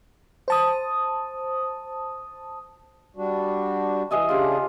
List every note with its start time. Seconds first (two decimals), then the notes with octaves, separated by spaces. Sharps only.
0.48 C5 A5 D#6
3.16 G3 D4 F#4
4.11 E3 G#4 D#5 E5
4.29 C#3 D4 F4 G4 G#4